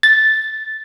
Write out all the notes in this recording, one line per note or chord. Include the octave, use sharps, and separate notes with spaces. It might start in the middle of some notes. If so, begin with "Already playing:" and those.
A6